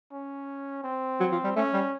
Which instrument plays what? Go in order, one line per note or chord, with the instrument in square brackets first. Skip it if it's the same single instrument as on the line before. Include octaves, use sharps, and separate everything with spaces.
[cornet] C#4
C4
[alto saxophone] F#3
F3
G3
[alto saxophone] A3 [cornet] C#4
[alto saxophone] G3